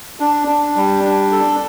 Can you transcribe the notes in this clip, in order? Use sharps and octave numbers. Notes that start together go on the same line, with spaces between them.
D4
D4
G3
D4
A4